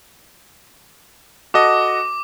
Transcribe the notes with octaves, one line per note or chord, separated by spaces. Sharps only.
F#4 A4 D#5 D6